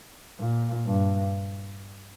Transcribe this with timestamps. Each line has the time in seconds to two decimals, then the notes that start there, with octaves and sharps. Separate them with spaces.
0.39 A#2
0.86 G2